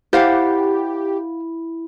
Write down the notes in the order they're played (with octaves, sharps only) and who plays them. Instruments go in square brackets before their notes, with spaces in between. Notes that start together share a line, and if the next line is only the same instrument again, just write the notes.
[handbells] E4 [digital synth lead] G4 [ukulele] C5 F5 F#5